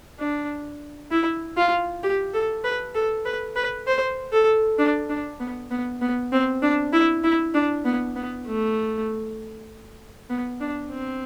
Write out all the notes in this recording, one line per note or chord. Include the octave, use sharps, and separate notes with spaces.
D4
E4
F4
G4
A4
B4
A4
B4
B4
C5
A4
D4
D4
B3
B3
B3
C4
D4
E4
E4
D4
B3
B3
A3
B3
D4
C4